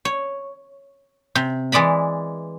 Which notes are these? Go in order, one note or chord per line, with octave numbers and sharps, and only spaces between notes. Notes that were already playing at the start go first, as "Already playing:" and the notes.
C#5
C3
E3 G#3 D5 A#5 B5